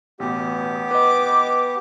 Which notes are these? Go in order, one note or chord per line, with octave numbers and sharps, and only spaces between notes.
A1 B2 B3 G4
B4 D#5 D6